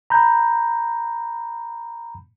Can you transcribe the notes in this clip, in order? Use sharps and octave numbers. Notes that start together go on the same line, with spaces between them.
A#5 B5 G6